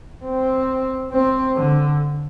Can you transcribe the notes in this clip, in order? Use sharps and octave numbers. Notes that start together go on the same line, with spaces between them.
C4
C4
D3